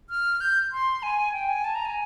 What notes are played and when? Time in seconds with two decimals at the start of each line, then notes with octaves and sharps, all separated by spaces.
0.10 F6
0.41 G6
0.72 C6
1.03 G#5
1.33 G5
1.49 G#5
1.64 A5
1.75 A#5
1.85 G#5